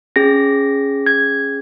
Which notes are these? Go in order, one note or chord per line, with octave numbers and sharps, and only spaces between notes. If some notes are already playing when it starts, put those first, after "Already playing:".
C#4 G#4 A#6
G#6